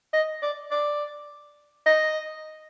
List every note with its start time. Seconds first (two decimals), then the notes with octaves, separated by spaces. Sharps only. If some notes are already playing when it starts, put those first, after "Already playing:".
0.13 D#5
0.42 D5
0.71 D5
1.86 D#5